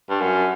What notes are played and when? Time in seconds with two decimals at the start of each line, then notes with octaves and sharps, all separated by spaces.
0.09 G2
0.21 F#2